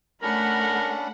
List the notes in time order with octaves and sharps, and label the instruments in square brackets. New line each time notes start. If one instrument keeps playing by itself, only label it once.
[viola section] A3 F#5 B5 [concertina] C#4 D4 [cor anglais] A#4